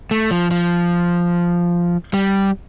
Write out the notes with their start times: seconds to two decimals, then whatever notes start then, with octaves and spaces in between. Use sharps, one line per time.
0.11 A3
0.31 F3
0.51 F3
2.14 G3